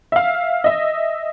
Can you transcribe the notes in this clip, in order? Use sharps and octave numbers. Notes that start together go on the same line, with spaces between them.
E5 F5
D#5 E5